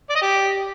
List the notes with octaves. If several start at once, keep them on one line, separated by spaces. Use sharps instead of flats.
D5
D#5
G4